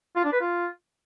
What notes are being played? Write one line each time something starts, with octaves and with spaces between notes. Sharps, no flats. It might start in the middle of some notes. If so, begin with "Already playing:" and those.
F4
D4
B4
F4